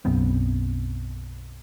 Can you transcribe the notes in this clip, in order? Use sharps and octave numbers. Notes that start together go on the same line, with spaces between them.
B1 F#2 B3 C4